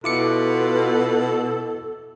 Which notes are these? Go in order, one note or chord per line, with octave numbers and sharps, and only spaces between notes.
B2 E4 F4 A4 B4 D6 C#7